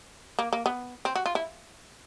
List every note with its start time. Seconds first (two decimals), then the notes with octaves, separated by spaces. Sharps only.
0.39 A#3
0.53 A#3
0.66 B3
1.05 C4
1.16 F#4
1.26 F4
1.35 E4